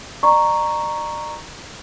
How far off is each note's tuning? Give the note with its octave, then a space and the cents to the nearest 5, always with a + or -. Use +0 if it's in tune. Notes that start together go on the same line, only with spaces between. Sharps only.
D5 +40 A#5 +0 C#6 +0